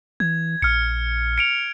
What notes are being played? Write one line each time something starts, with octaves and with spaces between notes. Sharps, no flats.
E3 G#6
A#1 F6 C#7
C#7 D7 F7